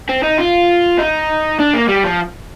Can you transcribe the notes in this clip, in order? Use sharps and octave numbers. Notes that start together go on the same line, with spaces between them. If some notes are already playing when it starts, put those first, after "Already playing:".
C4
D#4
F4
D#4
D4
A#3
G3
F3